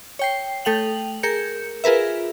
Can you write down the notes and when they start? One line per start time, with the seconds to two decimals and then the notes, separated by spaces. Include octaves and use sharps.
0.19 C#5 G5 C7
0.65 A3 A4 G5 F7 F#7
1.23 G#4 A#4 G6 C#7
1.84 F4 G#4 A#4 B4 E5